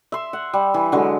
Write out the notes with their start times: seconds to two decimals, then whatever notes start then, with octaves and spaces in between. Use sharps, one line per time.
0.12 E5 C6
0.33 F#5
0.53 G3
0.74 E3
0.92 D3 F#3 G#3